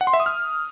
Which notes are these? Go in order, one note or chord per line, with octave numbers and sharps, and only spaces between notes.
F#5
C6
E5
D#6
F6